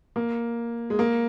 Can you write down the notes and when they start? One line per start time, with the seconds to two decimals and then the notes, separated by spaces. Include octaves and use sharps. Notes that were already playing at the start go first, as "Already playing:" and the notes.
0.16 A#3
0.90 G#3
0.99 A#3